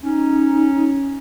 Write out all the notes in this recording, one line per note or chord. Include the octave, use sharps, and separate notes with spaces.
C#4 D#4